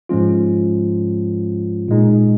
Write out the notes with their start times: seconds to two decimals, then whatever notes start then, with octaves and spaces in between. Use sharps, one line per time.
0.09 G#2 F3 G#3 C#4 F4
1.88 A#2 G#3 D#4